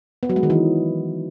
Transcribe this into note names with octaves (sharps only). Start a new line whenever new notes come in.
B3
F#3
G#3
D#3
E3